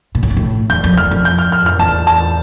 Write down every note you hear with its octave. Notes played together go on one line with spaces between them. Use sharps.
A#2
A2
G2
A2
E2 G6
F2
E2 F6
F2
G6
F6
F6
F6
E2 A5
A5